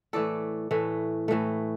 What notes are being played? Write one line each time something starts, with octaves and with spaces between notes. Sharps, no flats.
A2 E3 A3 A4 D5
A2 E3 A3
A2 E3 A3